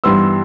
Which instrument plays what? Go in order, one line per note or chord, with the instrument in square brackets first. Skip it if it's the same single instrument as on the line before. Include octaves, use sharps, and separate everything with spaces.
[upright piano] G2 E3 G3 B3 C6 E6